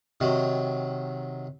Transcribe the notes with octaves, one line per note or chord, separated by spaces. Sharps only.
C3 D#3 F#3